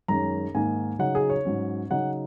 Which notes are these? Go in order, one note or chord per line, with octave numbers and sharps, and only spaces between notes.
F#2 D#3 G#3 C#4 A#5
G#2 D#3 A#3 G#5
C#3 F#3 D#4 F#5
G#4
C#5
G#2 F#3 C#4
C#3 F#3 D#4 F#5